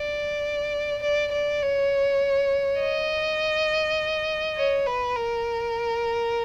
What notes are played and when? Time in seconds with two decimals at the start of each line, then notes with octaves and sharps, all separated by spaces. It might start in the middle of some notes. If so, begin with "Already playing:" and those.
Already playing: D5
1.03 D5
1.32 D5
1.62 C#5
2.80 D#5
4.57 C#5
4.87 B4
5.16 A#4